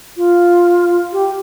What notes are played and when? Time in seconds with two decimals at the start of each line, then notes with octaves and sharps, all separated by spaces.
0.17 F4
1.12 G4